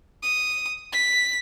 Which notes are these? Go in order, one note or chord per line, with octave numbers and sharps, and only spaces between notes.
D#6
B6